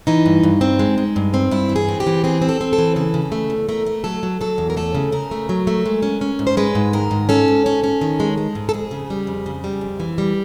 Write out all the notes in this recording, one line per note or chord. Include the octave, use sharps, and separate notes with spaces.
E3 D#4
G2
G2
C4
G#3
G#3
G2
C4
G2 E4
E3
G#4
C4
G4
E3
C4 G#4
C4
A4
C4
A4
E3
C#3 A4
C#3
A3
E2
A3 A#4
A3
F#3 A4
F#3
F#3 A4
E2
A#4
A3 A4
C#3
C#3 A#4
A3
F#3
A3
G#3
C#4
C#4
G#2
C5
G#3 B4
G#2
D#3 A#4
G#2
C#4 A4
G#2
C#4
C#4
D#3
G#3
G#3
G#2
A4
F2 G#4
C#3
G3
F2
C#3
G3
F2
E3
G3